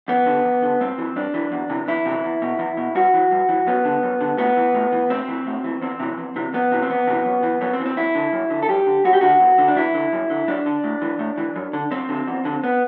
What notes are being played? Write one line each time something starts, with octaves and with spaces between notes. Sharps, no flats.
E2 B3
D3
E2
D3
G2 C4
E3
G2 D4
E3
E2
C3 E3
E2 E4
C3 E3
E2
B2
E2
B2
G2 F#4
E3
G2
E3
F#2 B3
D3
F#2
D3
A2 B3
E3
A2
E3
A2 C4
E3
A2
E3
E2 C4
C3 E3
E2
C3 E3
E2 B3
C3 E3
C4
E2 B3
C3 E3
F#2
E3
F#2 B3
C4
E3
C4
F#2 E4
D3
F#2
D3
A4
F#2 G4
D3
F#2 F#4
G4
D3 F#4
E2
D3
D4
E2 E4
D3
F#2
D3
F#2 D4
D3
A2
E3
A2
E3
F#2
D3
F#2 C4
D3
E2
D3
B3